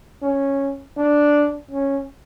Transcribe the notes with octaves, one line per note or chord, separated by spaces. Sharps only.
C#4
D4
C#4